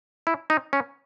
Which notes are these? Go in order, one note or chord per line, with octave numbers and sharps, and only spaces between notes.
E4
D#4
C#4